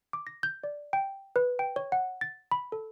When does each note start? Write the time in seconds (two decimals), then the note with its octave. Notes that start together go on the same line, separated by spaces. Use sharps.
0.13 D6
0.27 A#6
0.43 G6
0.64 D5
0.93 G5
1.36 B4
1.59 G5
1.76 C#5
1.92 F#5
2.21 A6
2.51 B5
2.72 A4